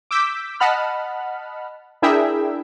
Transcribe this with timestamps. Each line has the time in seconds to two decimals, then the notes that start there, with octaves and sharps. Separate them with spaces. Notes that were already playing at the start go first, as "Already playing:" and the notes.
0.11 D6 E6 G6 B6 D7
0.60 D#5 F#5 A5 B5 F6
2.02 D4 E4 G#4 A#4 E5 G5